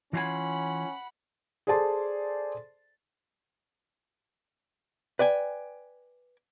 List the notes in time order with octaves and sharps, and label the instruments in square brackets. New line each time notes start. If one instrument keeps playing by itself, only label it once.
[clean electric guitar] E3 F4 G#5 [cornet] C#4 [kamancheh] F#5 B5
[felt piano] G#4 A4 C5 D5 A5 C6
[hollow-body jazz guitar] B4 D5 G5 G#5